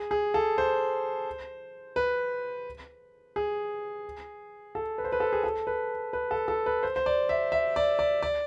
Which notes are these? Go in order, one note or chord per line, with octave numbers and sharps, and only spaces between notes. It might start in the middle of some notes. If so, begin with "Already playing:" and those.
Already playing: G#4
G#4
A4
C5
B4
G#4
A4
B4
C5
B4
A4
G#4
A4
B4
B4
A4
A4
B4
C5
C5
D5
E5
E5
D5
D5
D5